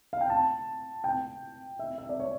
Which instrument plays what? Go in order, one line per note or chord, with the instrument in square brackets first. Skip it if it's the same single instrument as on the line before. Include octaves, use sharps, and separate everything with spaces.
[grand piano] F5
G5
A5
G5
E5
E5
D5
C#5